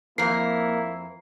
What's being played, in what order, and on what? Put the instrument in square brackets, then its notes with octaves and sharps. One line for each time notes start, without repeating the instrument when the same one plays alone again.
[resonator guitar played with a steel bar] F2 A#4 [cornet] A#3 [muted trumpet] E4 [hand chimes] C7